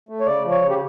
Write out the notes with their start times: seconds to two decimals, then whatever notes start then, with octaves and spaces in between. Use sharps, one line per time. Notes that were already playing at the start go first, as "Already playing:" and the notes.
0.09 A3
0.20 C#5
0.26 C#3 D5
0.44 F3
0.50 C#5
0.62 C#3
0.70 G4